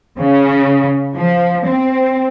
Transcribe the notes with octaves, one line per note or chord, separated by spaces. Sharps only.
C#3
F3
C4